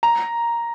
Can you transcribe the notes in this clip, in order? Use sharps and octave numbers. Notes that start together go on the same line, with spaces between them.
A#5